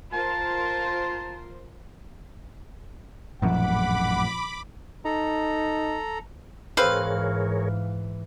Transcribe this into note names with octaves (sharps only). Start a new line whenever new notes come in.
F4 A#4 C5 A5
A1 F#2 A#2 F3 F#5 B5 D6
D#4 A4 A#5
G#2 E3 C4 G#4 A#4 B4 C#5 F5